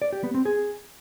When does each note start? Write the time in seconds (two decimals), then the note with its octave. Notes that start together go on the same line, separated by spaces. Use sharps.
0.02 D5
0.13 G4
0.24 B3
0.34 C4
0.45 G#4